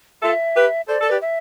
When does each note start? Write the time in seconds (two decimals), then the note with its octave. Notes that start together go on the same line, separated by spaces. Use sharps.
0.22 F4 A4 E5
0.55 G4 B4
0.88 A4 C5 D5
1.01 A4
1.10 G4 B4
1.22 E5